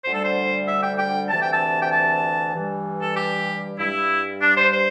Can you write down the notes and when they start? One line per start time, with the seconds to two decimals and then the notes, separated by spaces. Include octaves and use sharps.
0.05 D2 D3 G3 C5
0.14 A4
0.23 C5
0.68 E5
0.83 G5
0.99 G5
1.30 D2 C3 E3 A5
1.42 G5
1.53 A5
1.83 G5
1.92 A5
2.55 G2 E3 G3
3.02 A4
3.17 G4
3.79 G2 G3 E4
4.42 D4
4.57 C5
4.73 C5